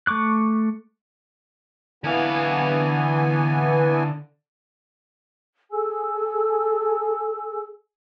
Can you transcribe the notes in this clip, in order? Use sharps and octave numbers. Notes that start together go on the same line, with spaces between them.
A3 C#6 D6 F#6
D3 E3 B3 F5 G#5
G#4 A4 G#5 E6